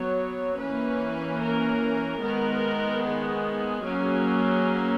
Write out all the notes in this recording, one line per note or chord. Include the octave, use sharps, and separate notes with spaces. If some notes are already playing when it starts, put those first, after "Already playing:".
Already playing: F#3 B3 C#5
E3 A#3 C#4 B4
A#4
D#3 G#3 B3 A#4
G#4
F#3 A#3 C#4